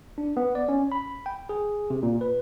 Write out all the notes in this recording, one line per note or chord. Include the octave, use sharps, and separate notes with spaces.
D4
B3
D5
C#4
B5
G5
G#4
C3
A#2
B4